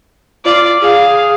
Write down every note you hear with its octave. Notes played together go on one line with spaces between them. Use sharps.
F4 D5
G#4 F5